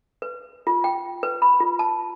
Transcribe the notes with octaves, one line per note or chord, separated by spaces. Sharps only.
B4
F4
G5
B4
B5
F4
A5